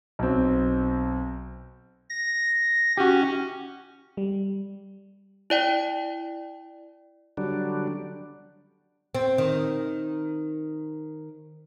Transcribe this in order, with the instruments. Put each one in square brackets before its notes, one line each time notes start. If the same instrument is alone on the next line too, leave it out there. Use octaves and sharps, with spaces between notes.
[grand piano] B1 C4
[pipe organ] A#6
[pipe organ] C#4 [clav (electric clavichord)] F#4 G4
[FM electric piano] G3
[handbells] E4 D5 G5
[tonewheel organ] D3 F#3 G3 D4
[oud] C4
D#3